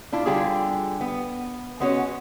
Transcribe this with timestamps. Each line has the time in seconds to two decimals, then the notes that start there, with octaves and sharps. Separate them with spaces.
0.12 D4 E4 F4
0.26 D3 G3 F4 G4 G#4
1.01 B3
1.80 G#3 B3 C#4 F#4 C#5